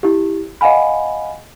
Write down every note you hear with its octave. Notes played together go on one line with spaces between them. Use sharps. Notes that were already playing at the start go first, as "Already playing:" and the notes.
E4 G4
D#5 F5 F#5 G#5 B5